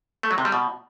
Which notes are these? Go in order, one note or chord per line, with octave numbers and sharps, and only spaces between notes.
A3
F#3
C3
G3
B2